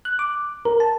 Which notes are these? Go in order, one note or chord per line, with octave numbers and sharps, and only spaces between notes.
F#6
D6
A#4
A5